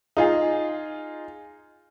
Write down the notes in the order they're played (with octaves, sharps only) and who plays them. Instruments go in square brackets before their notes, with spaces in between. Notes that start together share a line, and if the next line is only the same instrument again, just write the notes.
[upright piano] D#4 F4 G#4